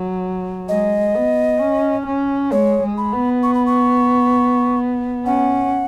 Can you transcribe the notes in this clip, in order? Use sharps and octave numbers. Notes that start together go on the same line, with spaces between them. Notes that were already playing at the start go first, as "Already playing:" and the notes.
Already playing: F#3
G#3 D#5
B3
C#4
C#4
G#3 C#5
G#3
B5
B3
C#6
B5
C#6
C#4 F#5